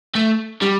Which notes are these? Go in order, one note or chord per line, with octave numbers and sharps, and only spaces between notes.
A3
G3